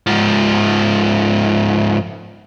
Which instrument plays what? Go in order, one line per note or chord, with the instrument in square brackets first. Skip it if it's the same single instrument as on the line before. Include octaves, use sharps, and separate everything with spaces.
[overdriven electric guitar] G#2 F3